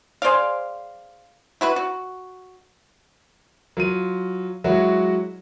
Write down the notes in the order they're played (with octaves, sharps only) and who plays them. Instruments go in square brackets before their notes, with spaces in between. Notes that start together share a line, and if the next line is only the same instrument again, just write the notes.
[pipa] G#4 C5 D5 F5
E4 F#4 B4
F#4
[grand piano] F#3 F4 D#7
F#3 G#3 E4 F#4 C#5